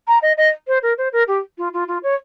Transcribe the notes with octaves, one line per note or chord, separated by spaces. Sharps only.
A#5
D#5
D#5
C5
A#4
C5
A#4
G4
F4
F4
F4
C#5